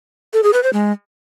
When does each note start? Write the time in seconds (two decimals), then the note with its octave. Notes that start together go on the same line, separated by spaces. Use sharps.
0.33 A4
0.43 G#4
0.53 B4
0.63 C5
0.73 G#3